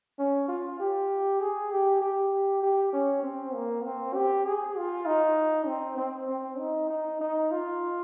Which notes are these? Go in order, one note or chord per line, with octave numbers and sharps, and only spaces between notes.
C#4
F4
G4
G#4
G4
G4
G4
C#4
C4
A#3
C4
G4
G#4
F4
D#4
C4
C4
C4
D#4
D#4
D#4
F4